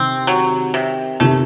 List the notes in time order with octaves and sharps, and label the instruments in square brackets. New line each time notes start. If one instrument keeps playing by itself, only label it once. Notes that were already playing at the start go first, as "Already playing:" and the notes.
Already playing: [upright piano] C3 D#3 [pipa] C4
[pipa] F#3
C3
[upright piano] C3 D#3 [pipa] A3